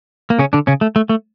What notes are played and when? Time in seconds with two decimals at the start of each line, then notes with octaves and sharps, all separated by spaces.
0.30 A#3
0.39 C#3 C#4
0.53 D3 D4
0.67 C#3 C#4
0.81 A3
0.96 A3
1.09 A3